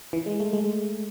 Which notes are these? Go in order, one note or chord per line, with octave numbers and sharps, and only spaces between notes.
E3
G#3
A3
G#3